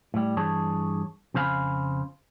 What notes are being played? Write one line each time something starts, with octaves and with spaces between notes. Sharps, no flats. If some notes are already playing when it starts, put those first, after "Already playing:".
A2 G3
G2 E3 G#4 C#5 A5
F2 C#3 C5 F5 G#5 B5